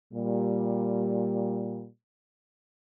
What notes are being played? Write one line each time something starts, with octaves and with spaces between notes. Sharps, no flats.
A#2 G3